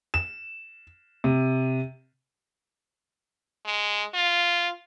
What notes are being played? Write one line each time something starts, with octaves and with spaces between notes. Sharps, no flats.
E7
C3
G#3
F4